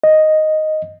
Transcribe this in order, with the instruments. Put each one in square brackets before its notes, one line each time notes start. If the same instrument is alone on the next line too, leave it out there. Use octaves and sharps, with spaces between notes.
[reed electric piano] D#5